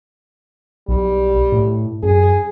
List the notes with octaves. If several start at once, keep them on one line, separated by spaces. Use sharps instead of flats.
B1 G3
A2
F#2 G#4